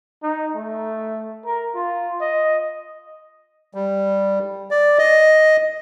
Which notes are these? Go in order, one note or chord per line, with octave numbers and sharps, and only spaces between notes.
D#4
A3
A#4
F4
D#5
G3
D5
D#5